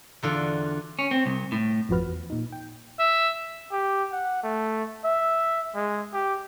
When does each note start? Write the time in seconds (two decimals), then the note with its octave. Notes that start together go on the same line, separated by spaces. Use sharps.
0.23 E2 D3 F4 F#4
0.99 C#4
1.11 C4
1.26 C2
1.52 A2
1.89 G#1 F2 F3 F#4 B4 F6
2.06 E2
2.30 A#2 D#4
2.52 G5
2.99 E5
3.72 G4
4.12 F#5
4.43 A3
5.05 E5
5.75 G#3
6.14 G4